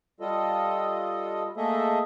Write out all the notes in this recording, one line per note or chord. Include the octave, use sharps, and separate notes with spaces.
G3 F4 A4 D#5
A3 A#3 G#4 A4 D#5 E5